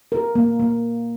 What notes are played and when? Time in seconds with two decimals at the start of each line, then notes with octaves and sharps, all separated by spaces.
0.12 A#4
0.35 A#3
0.60 A#3